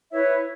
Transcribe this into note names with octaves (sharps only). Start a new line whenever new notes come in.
E4 B4 C#5 E5